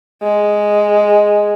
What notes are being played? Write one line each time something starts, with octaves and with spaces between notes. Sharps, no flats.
G#3